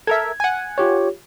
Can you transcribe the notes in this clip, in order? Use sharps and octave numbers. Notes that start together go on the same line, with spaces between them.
A4 A#4 E5 G#6
F#5 G#5
F4 G4 C#5